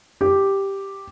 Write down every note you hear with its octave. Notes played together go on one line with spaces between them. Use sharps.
G4